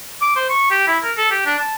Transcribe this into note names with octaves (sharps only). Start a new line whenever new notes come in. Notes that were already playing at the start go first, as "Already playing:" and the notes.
D6
C5
C#6
G4
E4
A#4
A4
G4
D4
A5